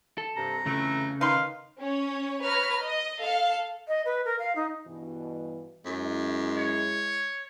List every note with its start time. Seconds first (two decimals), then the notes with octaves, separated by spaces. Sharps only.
0.18 A4
0.37 G2 C3 A#5
0.66 F2 C#3 E3 A3
1.21 D#3 D#4 B4 F5 C6
1.79 C#4 C#5
2.42 B4 C#5 A#5 F6
2.82 D#5
3.21 A4 F5
3.87 D#5
4.05 B4
4.24 A#4
4.38 F5
4.55 D#4
4.86 G2 B2 E3
5.86 F#2 G#3 E4
6.57 C#5